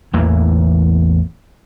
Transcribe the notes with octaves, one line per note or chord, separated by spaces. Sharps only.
A1 E2 E3 A#3